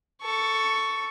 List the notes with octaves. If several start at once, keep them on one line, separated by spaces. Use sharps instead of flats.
A4 C#6